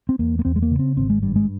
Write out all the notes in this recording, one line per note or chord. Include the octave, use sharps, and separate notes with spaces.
C4
E2 A#3
A#3
E2 C4
G#3
A#3
C#3
C4
G#1 C4
G#3
G2 G3
G#3